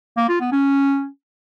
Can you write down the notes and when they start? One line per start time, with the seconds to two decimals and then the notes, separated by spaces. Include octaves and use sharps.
0.17 A#3
0.29 F4
0.41 B3
0.52 C#4